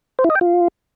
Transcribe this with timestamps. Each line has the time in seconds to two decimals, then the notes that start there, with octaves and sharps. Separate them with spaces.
0.19 C5
0.24 E4
0.30 D#5
0.35 G5
0.41 F4